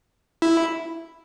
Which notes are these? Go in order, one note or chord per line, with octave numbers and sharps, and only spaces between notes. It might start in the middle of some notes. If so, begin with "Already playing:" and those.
E4